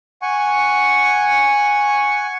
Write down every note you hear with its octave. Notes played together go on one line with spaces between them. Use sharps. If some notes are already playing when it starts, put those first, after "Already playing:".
F#5 G#5 C#6